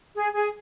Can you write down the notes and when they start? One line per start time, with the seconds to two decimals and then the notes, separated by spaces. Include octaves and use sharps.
0.15 G#4
0.34 G#4